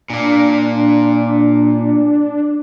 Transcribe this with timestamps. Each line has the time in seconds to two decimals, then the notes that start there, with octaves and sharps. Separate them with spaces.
0.10 A#2 A#3 D4